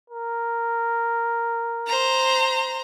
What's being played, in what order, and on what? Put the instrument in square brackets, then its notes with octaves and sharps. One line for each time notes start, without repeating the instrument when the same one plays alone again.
[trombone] A#4
[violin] C5 A#5